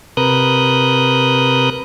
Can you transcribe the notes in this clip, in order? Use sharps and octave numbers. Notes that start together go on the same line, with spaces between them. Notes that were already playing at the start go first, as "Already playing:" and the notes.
C3 A#4 B4 D#6 F#6 G6